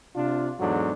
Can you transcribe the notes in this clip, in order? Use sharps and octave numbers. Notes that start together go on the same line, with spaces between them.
C3 D4 F4
E2 G#2 F#3 D4 F#4 A4